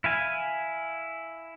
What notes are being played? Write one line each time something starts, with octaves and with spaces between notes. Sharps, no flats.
E4 F5 G#5